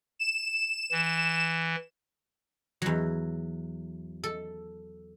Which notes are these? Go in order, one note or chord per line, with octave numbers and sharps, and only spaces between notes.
E7
E3
E2 F#3
A4